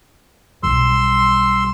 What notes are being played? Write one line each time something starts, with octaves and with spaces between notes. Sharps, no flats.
B1 G3 C6 E6